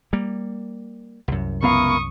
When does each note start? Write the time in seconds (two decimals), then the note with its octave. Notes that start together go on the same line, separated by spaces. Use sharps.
0.13 G3 A#3
1.28 C2 F#2
1.63 C#2 B3 E4 A#4 F5 C#6 D#6